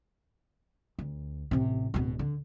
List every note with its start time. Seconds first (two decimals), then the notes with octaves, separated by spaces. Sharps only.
0.99 D2
1.51 A1 C3
1.94 D1 B2
2.19 D3